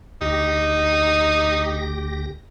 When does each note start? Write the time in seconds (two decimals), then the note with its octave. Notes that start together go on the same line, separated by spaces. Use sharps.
0.21 D2 D#4 G4 A#6